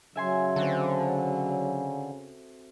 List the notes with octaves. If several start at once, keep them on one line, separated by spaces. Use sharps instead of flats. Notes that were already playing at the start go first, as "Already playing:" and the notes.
C#3 F#3 E5 G#5 C6
D3 C4 F#4 A4